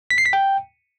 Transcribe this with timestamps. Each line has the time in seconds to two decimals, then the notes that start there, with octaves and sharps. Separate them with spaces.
0.10 B6
0.18 C7
0.26 B6
0.33 G5